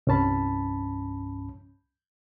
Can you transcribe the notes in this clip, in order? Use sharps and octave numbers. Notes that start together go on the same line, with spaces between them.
C2 G2 C#4 A5 B5